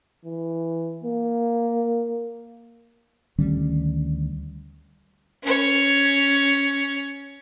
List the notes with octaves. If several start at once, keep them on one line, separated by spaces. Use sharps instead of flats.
E3
A#3
D2 D#3 G3 C#4
C#4 C#5